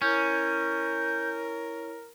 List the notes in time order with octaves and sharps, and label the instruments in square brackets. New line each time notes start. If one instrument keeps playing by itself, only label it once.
[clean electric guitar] C#4 [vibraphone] E4 C#5 [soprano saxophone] A#4 [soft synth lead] G6